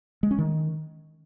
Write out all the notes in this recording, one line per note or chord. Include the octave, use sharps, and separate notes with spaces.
G#3
C#4
D#3